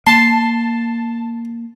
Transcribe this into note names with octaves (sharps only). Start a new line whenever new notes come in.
A#3 A5 C6